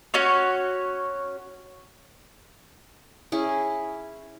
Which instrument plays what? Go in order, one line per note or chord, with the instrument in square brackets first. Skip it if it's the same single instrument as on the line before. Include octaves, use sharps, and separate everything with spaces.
[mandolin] C#4 F#4 C#5
[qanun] C#4 E4 G#4